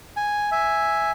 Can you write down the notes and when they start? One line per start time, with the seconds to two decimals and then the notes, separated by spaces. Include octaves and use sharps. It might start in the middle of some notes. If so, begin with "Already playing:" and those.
0.17 G#5
0.52 E5 G#5